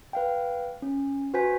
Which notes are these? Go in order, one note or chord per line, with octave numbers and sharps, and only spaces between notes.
B4 F5 G5
C#4
F#4 B4 C5 G#5 B6